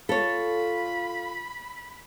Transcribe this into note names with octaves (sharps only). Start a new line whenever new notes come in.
F4 A4 C#5 B5